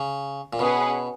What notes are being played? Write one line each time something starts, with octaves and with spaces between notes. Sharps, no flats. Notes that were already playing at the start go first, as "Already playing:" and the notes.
Already playing: C#3
A#2
B2 C#4 G#4 B4 F#5